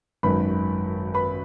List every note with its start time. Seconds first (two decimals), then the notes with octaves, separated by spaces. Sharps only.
0.23 G#1 F#2 D#3 B4 B5
1.14 B4 B5